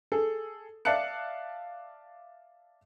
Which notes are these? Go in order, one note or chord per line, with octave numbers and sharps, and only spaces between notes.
G#4 A4
D5 E5 F5 A5 F#6 C#7